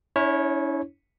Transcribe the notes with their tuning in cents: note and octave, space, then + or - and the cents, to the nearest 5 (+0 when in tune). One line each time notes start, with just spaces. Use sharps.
C#4 +35 E4 -25 C#5 -20